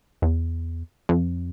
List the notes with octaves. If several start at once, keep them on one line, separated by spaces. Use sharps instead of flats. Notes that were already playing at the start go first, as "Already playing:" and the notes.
E2
F2